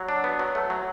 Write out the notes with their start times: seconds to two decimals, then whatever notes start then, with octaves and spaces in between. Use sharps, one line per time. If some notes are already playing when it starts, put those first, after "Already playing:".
Already playing: F#3
0.09 D4
0.24 B3
0.39 F#3
0.55 A3
0.70 F#3